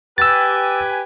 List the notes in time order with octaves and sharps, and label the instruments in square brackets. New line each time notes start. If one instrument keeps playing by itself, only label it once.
[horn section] G4 B4 G#5 [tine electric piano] E6 A6